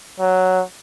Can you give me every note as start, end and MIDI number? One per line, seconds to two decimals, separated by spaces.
0.20 0.62 54